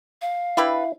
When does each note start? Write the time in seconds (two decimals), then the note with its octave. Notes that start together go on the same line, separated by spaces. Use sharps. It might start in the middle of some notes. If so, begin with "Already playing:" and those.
0.21 F5
0.57 D4 E4 G4 B4